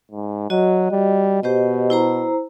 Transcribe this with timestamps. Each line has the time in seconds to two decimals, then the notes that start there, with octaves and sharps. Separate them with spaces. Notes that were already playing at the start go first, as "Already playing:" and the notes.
0.12 G#2
0.50 F#3 F#4 D#5
0.91 G3
1.43 B2 G4 C5 D#5
1.90 E4 C5 A#5